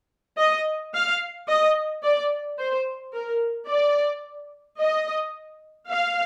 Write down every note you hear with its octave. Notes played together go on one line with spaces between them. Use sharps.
D#5
F5
D#5
D5
C5
A#4
D5
D#5
F5